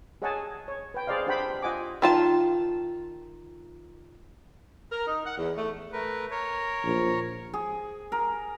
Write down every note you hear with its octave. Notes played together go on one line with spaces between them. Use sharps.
G#4 C#5 D#5 F#5 G#5 A5
C#5
B4 G5
G#4 C5 D5 D#5 F5
D4 G4 C5 F#5 G5 B5
F4 D#5 F#5 G#5 D6
D#3 F4 A5
A#4
D#4
F#5
E2
A3
A3 A#4 B4
A#4 C#5
A#1
G#4
A#4